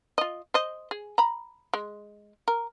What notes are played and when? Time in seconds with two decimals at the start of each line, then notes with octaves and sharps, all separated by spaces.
0.18 F4 D#5
0.54 C5 D#5
0.91 G#4
1.18 A#5 B5
1.74 G#3
2.48 A#4